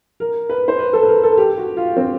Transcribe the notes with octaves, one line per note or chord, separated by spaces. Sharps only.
A#4
B4
C5
B4
A4
B4
A#4
A4
G4
F#4
F4
C4